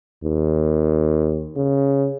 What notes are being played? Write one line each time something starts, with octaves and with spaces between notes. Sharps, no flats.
D#2
C#3